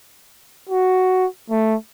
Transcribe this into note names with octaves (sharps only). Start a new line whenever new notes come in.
F#4
A3